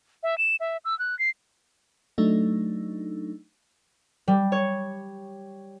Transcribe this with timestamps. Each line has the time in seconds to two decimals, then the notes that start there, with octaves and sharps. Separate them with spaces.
0.23 E5
0.38 E7
0.60 E5
0.85 E6
0.99 F#6
1.19 C7
2.18 F#3 A3 D4 D#4
4.28 G3
4.52 C#5